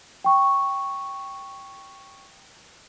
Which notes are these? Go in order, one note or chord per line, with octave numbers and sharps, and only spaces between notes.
G5 C#6